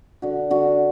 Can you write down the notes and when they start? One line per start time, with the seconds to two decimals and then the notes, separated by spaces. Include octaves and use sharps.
0.22 D3 F#4
0.50 D3 F#4